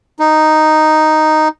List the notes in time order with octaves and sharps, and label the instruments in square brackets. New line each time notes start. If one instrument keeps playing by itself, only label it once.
[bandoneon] D#4